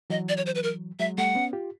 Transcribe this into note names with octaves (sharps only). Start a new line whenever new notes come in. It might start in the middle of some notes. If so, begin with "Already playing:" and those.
E3 F#3 D#5
D5
C#5
C5
B4
A#4
F#3 G#3 E5
G3 A3 F#5
B3 C#4
F4 G4